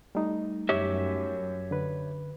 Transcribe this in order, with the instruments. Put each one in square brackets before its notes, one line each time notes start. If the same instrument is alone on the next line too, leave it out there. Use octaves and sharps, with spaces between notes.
[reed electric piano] G3 A3 D#4
[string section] F#2 [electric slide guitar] G4 C#5 E5
[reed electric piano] D3 B4